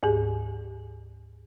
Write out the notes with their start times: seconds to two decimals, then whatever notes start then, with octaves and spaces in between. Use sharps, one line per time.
0.03 D2 G#2 G4 G#4